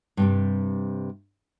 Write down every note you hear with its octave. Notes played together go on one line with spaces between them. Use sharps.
G2 C3 G3